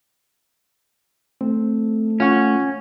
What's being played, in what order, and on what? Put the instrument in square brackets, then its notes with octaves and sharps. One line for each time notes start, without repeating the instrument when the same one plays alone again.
[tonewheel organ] A3 [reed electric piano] C4
[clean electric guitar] C#4 [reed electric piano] F4 F#5 C#6